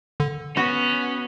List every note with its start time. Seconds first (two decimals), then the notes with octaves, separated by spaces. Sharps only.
0.20 D3
0.57 B3 C#4 F#4